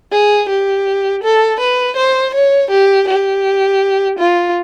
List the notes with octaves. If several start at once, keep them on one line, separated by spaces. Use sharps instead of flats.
G#4
G4
A4
B4
C5
C#5
G4
G4
F4